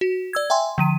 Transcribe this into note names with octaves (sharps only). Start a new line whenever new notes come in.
F#4
D5 E6 G#6
E5 G5 G#5 C6
D3 F3 D#7